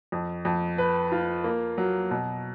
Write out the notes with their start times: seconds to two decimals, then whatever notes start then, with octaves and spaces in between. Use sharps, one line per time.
0.12 F2
0.45 F2
0.78 B4
1.12 F4
1.44 A#3
1.78 F#3
2.11 B2